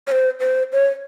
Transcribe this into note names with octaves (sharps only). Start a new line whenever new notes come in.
C#5
C5
C5
C#5